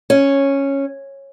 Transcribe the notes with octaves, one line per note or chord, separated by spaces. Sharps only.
C#4